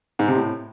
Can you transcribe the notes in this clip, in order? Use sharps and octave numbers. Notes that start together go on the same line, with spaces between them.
G#2
C3
A2